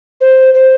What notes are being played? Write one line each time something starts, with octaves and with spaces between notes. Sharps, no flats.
C5
C5